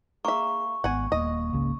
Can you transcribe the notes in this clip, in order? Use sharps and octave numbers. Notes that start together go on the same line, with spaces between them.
A#3 G#4 E5 C#6
G#1 B3 F#5 G#5
D#1 A#3 D#5
G#1 C#2 C#3